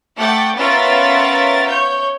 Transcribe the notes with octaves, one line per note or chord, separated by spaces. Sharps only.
A3 F#5 G5 D6 G6 A6
B3 C#4 F4 A#4 E5 A6
C#5 G6